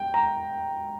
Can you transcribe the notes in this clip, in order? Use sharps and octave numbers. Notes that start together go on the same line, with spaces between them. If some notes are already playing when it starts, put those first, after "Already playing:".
Already playing: G5
A#5